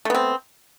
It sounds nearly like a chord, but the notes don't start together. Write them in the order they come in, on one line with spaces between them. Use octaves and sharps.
A3 B3 C4